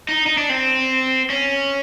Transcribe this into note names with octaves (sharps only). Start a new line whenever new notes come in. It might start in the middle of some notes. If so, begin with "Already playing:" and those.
D#4
D#4
D4
C4
C#4